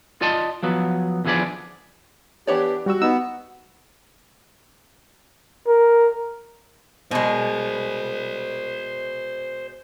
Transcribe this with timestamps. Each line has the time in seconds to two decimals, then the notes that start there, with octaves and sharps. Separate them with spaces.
0.21 F4 D5 D#5 A5 C6
0.63 F3 F#3 B3
1.25 E2 D3 F3 G#4 B4 D5
2.47 E3 B3 D4 G4 C#5 D5
2.86 G3 F#4 E6
3.02 B3 D#4 E6
5.67 A#4
7.11 B2 G#3 C5 D5